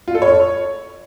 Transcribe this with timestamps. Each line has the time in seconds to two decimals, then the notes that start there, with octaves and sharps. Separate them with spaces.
0.08 F4
0.15 A4
0.22 C#5